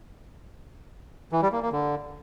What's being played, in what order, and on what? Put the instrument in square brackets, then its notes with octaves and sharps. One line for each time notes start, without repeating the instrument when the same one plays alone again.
[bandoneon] E3
G3
A#3
A#3
D3